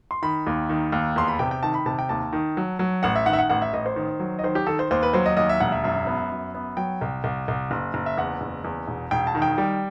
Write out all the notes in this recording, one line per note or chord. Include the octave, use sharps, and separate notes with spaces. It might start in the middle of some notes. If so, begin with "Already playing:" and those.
C6
D#3 B5
D#2
D#3
D#2
E2 C6
B5
C3 G5
G5
D#3 A5
B5
C3 A5
G5
D#2 A5
D#3
F#3
F#3
A1 F#5
E5
D#3 F#5
E5
F#5
A1 F#5
E5
A1 D#5
C5
D#3
F#3
D#5
D#3 C5
G4
D#3 A4
C5
D#2 C5
B4
F#3 C5
D#5
D#2 D#5
E5
E1 F#5
E5
F#2 E5
B3
F#2
B3
F#3 G5
C2
C2
C2
F#1
F#1
E5
E2 F#5
F#1
E2
E1
E1 G5
A5
D#3
G5
G3